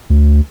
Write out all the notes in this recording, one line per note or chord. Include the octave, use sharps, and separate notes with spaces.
D2